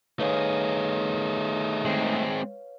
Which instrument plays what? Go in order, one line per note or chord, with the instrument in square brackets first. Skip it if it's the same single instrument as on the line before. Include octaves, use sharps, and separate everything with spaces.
[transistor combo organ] D#3 D#4 [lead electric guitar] A3 G#4 [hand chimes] B4 C#5 F5
[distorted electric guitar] G#3 C4